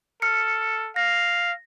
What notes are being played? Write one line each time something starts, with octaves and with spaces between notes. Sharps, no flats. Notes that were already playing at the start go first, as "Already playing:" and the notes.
A4 F6 C#7
F5 A#6